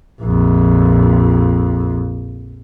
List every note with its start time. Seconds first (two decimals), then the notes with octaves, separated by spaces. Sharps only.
0.21 A#1 F2